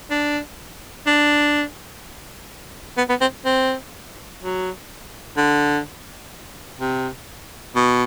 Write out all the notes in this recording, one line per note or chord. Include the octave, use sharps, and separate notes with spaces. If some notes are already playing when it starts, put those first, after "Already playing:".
D4
D4
B3
B3
C4
C4
F#3
D3
C3
B2